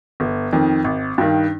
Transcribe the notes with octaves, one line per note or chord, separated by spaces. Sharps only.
G1
F2 D#3
G#1
G2 D#3